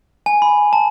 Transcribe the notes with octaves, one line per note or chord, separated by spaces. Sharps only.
G#5
B5
A5